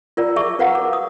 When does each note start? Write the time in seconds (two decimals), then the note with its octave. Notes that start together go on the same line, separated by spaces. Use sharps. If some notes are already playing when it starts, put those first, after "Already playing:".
0.17 F4 A#4 D5 A#5
0.36 G#4 E5 A5 C#6 D6
0.59 F#4 A#4 B4 F5 F#5 A#5
0.75 D6
0.93 D#6